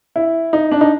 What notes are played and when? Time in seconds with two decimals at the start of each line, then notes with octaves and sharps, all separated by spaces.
0.16 E4
0.53 D#4
0.72 D4
0.81 D#4